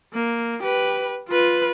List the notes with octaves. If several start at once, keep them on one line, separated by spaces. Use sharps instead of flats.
A#3
G4 B4
F4 B4